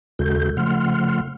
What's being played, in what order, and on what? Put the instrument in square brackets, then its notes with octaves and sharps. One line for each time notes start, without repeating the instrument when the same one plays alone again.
[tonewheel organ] D#2 C#3 G#3 F#4 A4 G6
C#3 F3 A3 F#5 C6 F6